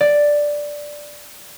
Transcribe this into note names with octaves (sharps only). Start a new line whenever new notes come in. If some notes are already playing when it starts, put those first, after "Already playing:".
D5